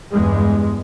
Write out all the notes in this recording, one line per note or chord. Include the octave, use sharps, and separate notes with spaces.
E2 G2 G#3